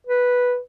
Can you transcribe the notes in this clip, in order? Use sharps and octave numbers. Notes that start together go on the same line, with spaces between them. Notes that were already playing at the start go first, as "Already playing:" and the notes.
B4